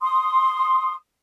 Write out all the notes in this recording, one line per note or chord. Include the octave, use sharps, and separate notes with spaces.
C6 D#6